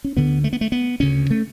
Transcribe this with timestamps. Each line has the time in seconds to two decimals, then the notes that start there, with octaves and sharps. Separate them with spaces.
0.04 C#4
0.16 D2 D3 B3
0.44 A3
0.53 B3
0.61 A3
0.72 B3
1.00 D2 C#3 C#4
1.31 A3